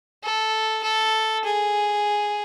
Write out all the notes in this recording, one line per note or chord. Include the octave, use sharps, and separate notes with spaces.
A4
A4
G#4